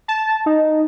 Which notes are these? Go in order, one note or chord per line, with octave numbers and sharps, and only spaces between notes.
A5
D#4